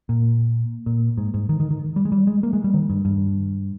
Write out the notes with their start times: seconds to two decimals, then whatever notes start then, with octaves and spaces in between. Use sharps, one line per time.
0.09 A#2
0.86 A#2
1.18 G#2
1.34 G#2
1.49 D#3
1.60 D#3
1.71 D#3
1.96 G3
2.05 G#3
2.12 G3
2.27 G#3
2.43 A#3
2.53 G#3
2.64 G3
2.74 D#3
2.90 G2
3.05 G2